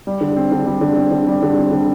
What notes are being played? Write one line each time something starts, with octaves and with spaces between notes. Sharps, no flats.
G3
D3
C4
D3
G3
D3
C4
D3
G3
D3
C4
D3